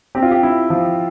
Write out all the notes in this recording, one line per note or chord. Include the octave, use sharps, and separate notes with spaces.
C4 G4
F4
G4
E4
F3